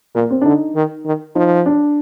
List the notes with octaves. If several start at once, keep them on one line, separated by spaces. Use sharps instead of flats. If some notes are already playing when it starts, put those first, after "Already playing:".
A#2 A#3
C4
D4
D3 D#4
D#3
D#3
F3 D#4
D4